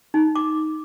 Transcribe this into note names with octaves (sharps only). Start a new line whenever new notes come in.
D#4
D6